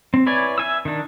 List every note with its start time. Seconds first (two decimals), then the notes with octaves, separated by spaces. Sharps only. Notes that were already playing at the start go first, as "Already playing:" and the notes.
0.14 C4
0.26 E4 B4 C#5 D5 G#5
0.58 E5 G#5 E6
0.85 D#3 D4